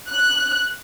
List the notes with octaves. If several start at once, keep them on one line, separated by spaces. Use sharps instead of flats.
F#6